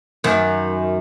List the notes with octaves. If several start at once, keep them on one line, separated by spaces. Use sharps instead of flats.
F#2 D#3